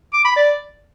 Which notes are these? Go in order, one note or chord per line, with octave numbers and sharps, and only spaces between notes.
D6
B5
D5